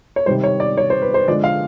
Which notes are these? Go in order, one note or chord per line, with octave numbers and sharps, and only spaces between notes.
C#5
C3 D#3 G3 C5
C#5
D5
C#5
C5
B4
C5
D3 F3 G#3 D5
F5